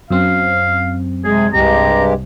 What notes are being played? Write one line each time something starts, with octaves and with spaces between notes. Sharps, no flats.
F#2 F#3 C4 F5
C3 G#3 G#4
C2 G2 G#3 G4 A#5